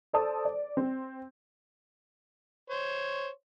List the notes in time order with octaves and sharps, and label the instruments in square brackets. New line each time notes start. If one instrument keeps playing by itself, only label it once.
[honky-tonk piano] A4 C5 D5 A5 D#6
D5
C4
[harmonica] C5 C#5